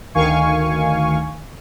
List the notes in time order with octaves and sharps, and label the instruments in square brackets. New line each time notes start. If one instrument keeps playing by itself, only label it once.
[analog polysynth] D2 D#3 F5 G#5 C#6